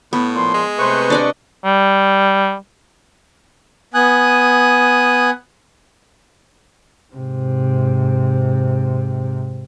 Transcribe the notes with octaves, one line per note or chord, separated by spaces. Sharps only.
A2 B3
A#2 F3 C6
G#3
C3 A3 B4 C5 C#6
D4 D5 D#5
G3
B3 G#5 D#6 F#6
G#2 C3